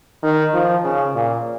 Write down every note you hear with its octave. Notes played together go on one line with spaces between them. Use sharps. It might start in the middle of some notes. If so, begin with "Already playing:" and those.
D#3
F3
C#3
A#2